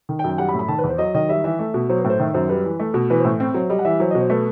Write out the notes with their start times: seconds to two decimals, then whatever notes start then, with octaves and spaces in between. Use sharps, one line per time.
0.09 D#3
0.19 G5
0.24 F#2
0.29 G5
0.38 G3 F#5
0.49 B5
0.54 A2
0.59 B5
0.68 D#3 A5
0.79 B4
0.84 E2
0.89 C5
0.98 F#3 D#5
1.14 D#3 D#5
1.29 G3 E5
1.44 E3 E5
1.59 A3
1.74 B2
1.89 F#3 C5
1.99 B4
2.04 A2
2.10 C5
2.20 D#3 E5
2.34 F#2 C5
2.49 G3 B4
2.65 E3
2.80 A3
2.94 B2
3.10 E3 B4
3.19 C5
3.25 A2
3.40 C4 C5
3.54 F#3 C5
3.69 G3 D#5
3.79 F#5
3.85 E3 E5
4.00 F#3 C5
4.11 D#5
4.15 B2
4.20 C5
4.30 A3 B4